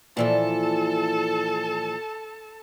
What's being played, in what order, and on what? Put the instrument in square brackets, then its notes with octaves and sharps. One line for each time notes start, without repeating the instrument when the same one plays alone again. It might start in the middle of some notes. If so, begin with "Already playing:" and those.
[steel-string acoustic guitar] A#2 E3 F3 [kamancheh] A4 A5